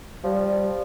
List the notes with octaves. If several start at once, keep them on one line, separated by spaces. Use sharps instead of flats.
F3 G3